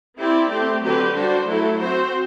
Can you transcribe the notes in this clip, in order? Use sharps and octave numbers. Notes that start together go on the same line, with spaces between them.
C4 E4 G4 D5
A3 C4 G4
D3 F#3 C4 G4 B4
G3 D4 F#4 C5
F#3 A3 E4 A4
C4 F#4 C5